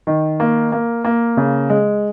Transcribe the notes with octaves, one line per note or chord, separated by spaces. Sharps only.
D#3
A#3
A#3
A#3
C#3
G#3